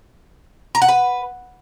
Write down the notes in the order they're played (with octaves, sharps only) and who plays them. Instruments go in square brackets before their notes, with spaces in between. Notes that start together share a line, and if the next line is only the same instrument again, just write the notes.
[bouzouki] A#5
F#5
B4